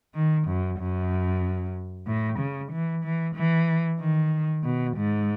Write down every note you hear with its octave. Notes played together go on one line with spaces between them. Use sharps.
D#3
F#2
F#2
A2
C#3
E3
E3
E3
D#3
B2
G#2